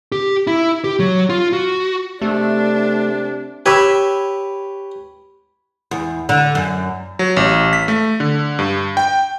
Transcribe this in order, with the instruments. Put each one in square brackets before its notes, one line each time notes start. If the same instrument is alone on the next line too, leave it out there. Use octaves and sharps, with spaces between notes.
[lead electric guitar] G4
E4
G4
F#3
F4
F#4
[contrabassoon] C3 [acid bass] A3 [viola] D4
[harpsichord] G4 B4 C#5 [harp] B5 E6 G#6
[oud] E2
D3
F#2
[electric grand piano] F#3
A1
B6
A3
D3
G2
G5